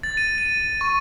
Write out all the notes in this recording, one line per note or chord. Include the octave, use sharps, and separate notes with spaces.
A6
D#7
D#7
C#6